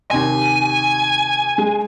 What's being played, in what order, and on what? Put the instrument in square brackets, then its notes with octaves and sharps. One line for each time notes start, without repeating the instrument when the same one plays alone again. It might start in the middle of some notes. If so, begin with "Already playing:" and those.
[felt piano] D#2 C3 C6 [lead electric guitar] G#5
[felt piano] G#3